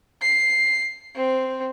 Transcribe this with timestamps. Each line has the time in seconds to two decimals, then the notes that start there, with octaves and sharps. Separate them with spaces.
0.22 C7
1.15 C4